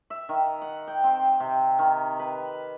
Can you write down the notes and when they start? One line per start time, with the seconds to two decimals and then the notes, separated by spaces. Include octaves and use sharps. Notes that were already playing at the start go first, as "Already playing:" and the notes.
0.10 E5
0.29 D#3
0.62 F#5
0.87 G5
1.04 C4
1.40 C3
1.79 D#3
2.19 B4